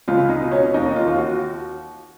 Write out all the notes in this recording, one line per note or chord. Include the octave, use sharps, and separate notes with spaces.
C#2 F4
D#4
B2
C#4
D#2 D#4
F4
D#2
F#4